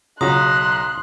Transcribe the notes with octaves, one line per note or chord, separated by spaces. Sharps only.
B1 C#3 F4 F#4 A#5 C6 D#6 F#6